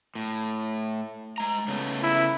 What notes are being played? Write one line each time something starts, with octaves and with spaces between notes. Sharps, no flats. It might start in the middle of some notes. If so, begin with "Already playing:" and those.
A2
G#3 A#5
C#3 A3 B3
E4